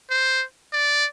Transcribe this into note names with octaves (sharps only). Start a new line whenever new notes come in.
C5
D5